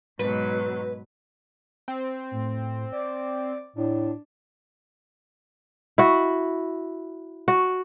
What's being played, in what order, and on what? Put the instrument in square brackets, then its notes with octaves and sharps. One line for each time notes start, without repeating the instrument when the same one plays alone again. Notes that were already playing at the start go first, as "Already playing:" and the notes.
[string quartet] G#2 B2 F#3 [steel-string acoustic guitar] B4
[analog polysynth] C4
[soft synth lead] A2
D5
[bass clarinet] A2 [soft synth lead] D4
[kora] E4 F#4
F#4